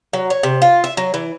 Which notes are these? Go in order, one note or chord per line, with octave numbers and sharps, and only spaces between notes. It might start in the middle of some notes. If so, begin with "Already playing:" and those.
F#3
C#5
C3
F4
E5
F#3
E3